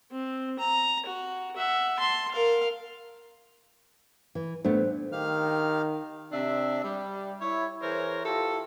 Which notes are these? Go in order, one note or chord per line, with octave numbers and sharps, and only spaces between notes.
C4
A#5
F#4
E5 F#5
A5 C6
A#4 F5
E3
A2 A3 B3 D4 C5
D#3 G4 F5 F6
C3 D4 E5
G3
E4 C#5
E3 E4 G#4 A#4 C5 C#5
E4 F4 G4 A4